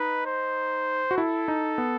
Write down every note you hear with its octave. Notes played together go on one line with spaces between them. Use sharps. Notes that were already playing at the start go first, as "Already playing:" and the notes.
Already playing: D#4 B4
C5
F#4
E4 A4
D#4
B3